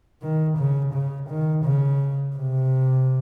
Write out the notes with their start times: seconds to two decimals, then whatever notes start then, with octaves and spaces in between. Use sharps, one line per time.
0.22 D#3
0.58 C#3
0.93 C#3
1.29 D#3
1.65 C#3
2.36 C3